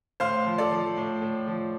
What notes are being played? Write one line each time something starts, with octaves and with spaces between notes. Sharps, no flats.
A2 C5 F5
F3
A4 D5
F3
A2
A2
F3